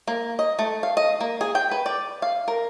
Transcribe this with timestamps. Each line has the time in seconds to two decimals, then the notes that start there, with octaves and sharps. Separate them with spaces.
0.08 A#3
0.39 D#5
0.59 A3
0.83 F5
0.97 D#5
1.21 A#3
1.41 G#4
1.55 G5
1.71 B4
1.86 D5
2.22 F5
2.48 A#4